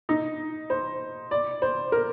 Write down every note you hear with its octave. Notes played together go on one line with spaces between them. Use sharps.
D#4
C5
D5
C5
A#4